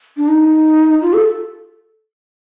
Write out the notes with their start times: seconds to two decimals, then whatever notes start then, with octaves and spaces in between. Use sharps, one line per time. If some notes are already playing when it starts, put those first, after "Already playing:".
0.17 D4
0.28 D#4
1.02 F4
1.13 A4